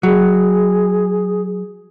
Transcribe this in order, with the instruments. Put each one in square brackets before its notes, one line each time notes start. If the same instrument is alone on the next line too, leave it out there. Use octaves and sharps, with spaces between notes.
[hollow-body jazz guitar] F#3 [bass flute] G#4